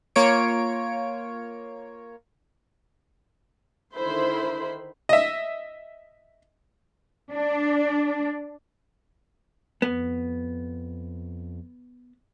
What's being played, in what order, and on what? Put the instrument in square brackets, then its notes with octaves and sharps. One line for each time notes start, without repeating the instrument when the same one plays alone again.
[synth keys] A#3 F4 C#5 D7
[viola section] D3 D#3 E4 C5 B5 C6
[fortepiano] D#5 E5
[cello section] D4
[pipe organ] F2 [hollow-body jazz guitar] B3